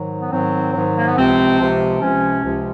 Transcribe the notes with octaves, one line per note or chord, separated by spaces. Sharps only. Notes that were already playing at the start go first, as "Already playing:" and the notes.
Already playing: G#2 D#3 F#3
B3
G#2 D#3 F#3 C4
G#2 D#3 F#3
A#3
B3
C#2 C3 F3 C4
C#2 C3 F3
C#2 C3 F3 C#4
C#2 C3 F3